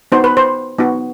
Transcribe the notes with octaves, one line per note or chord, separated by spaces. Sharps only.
B3 D#4 F#4 C5
B4
C5
B3 D#4 F#4